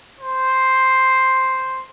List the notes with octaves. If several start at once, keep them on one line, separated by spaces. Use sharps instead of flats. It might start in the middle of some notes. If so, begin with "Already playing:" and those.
C5